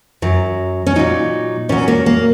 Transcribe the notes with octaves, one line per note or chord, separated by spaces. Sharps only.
F#2 F#3
C#4
A#2 F#3 D#4
A#2 F#3 C#4
A#3
A#3